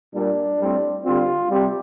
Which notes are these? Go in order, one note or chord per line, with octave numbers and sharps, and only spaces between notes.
A#2 G3 A#3 D4
A2 G3 C4
D3 G3 C4 F4
C3 G3 C4 G4